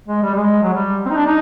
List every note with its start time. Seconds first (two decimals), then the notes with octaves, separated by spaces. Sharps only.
0.08 G#3
0.23 G3
0.35 G#3
0.63 F#3
0.73 G3
1.06 C4
1.11 D#4
1.16 D4
1.26 D#4